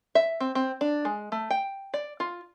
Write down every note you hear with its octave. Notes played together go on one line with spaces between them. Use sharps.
E5
C4
C4
D4
G#3
A3
G5
D5
F4